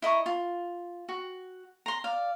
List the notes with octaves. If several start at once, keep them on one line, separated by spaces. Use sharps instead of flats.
E4 D#5 A#5 C#6
F4
F#4
A#5 C6
D5 F5